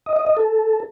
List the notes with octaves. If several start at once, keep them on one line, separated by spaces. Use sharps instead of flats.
D#5
D#5
D#5
A4